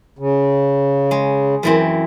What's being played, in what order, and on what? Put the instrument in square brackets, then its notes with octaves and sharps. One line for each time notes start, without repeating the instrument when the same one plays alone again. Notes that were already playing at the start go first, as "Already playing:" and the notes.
[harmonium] C#3
[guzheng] G#3
F#2 E3 C4